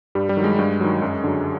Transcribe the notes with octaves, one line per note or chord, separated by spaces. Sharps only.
G2 G3
G3
D#3 F#3
G#3
G2
D#3 F#3
F#2
D3 F#3